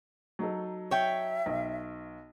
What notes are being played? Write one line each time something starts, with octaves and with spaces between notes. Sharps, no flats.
F#3 D#4 A4
C#5 E5 G5
B1